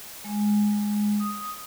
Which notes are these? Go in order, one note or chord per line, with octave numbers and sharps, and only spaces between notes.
G#3
D#6